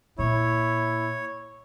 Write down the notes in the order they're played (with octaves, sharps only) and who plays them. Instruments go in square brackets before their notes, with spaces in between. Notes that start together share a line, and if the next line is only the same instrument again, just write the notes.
[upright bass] A#2 [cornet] E4 [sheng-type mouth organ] C#5